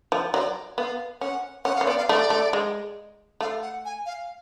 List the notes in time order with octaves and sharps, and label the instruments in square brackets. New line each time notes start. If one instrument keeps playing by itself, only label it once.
[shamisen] F3
[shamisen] F#3 [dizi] D5
[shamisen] B3 [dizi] F5
[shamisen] C#4 [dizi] F#5
[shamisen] C#4 [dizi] F#5
[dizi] F5
[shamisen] C#4
[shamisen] B3 [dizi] D5
[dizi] F5
[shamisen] A3 [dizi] D5
[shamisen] A3
G#3
[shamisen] A3 [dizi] F5
[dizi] F#5
G#5
F5